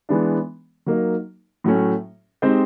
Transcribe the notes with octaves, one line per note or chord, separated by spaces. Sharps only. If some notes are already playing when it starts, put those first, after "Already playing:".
E3 G#3 B3 D4
F#3 A#3 D#4
A2 F#3 A3 C#4
G#3 C4 D#4 G4 C5